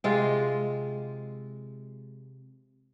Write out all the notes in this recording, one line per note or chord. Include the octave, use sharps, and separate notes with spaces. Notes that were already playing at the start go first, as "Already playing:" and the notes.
C3 G#3 F4